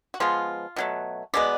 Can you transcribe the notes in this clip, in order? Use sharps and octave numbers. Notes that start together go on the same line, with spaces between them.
F#4
F3 G#3 B3 F4
B2 F#3 A3
B2 G#3 B3 D5